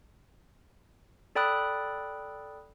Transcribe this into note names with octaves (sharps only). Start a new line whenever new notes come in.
A4 D5 G5 B5 D#6 F#6